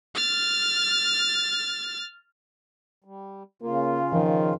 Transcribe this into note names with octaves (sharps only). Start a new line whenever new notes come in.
F6 A6
G3
C#3 A#3 F4
D#3 F3